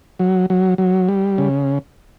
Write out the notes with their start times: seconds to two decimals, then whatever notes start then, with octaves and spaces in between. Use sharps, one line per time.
0.19 F#3
0.50 F#3
0.78 F#3
1.09 G3
1.38 C#3